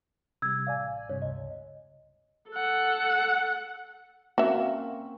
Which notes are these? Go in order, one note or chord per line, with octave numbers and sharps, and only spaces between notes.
C3 G3 E6 G#6
A1 D5 F5 G#5
G2 C3 C#5
C#2 D#5
A4 F#5
A#3 C4 C#4 F#4 E5